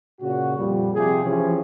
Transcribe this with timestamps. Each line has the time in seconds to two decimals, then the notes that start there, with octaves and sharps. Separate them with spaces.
0.21 A#2 C#3 F#4
0.57 F2 A#2 G3
0.94 C3 F3 G4 G#4
1.24 E3 F3 C#4 G4 G#4